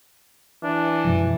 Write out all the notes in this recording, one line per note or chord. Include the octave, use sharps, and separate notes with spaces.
E3 D4
F#2 B2 F3